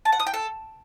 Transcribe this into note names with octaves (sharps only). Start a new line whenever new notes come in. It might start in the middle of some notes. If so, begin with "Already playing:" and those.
A5
F#5
D#6
G5
A4